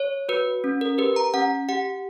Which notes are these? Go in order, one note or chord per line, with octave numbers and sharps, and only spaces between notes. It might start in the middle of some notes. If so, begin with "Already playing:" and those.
Already playing: C#5
F#4 B4
C#4
A#4
G4 B4
A#5
C#4 F#5
G4 F#5